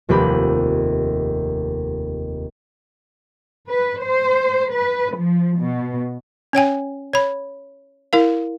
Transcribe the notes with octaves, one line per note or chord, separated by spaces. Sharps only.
F1 D#2 G4 B5
B4
C5
B4
F3
B2
C#4 C#5 G5 G#5
C#5 B5
E4 A#4 F5